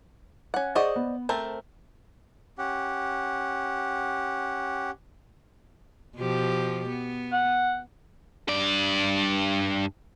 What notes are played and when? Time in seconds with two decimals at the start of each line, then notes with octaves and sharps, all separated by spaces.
0.54 C#4 F#5
0.75 G#4 C5 D5 D#5 F#5 C#6
0.96 B3
1.29 A3 C4 A#4 A5
2.58 C#4 G4 F#5
6.17 B2 F3 G4
6.89 B3
7.32 F#5
8.48 G2 D5